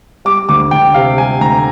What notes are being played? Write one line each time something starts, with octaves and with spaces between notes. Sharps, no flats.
G3 D6
D2 D6
D2 G5
C3 F5
G3 G#5
D2 A#5